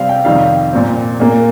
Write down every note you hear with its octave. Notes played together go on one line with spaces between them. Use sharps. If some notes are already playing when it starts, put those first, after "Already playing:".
Already playing: C3 G3 C4 F5
G5
F2 C3 D#3 G3 F5
A#2 G3 C4
A#2 A#3